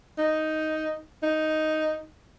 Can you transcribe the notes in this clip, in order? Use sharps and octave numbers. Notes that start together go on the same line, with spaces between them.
D#4
D#4